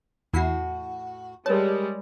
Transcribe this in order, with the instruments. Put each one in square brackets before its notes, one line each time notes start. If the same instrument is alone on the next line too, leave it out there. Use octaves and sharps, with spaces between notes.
[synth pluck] E2 E4 C7 [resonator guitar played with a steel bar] A2 F#4
[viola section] G3 G#3 [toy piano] A#4 C#5 [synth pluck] A5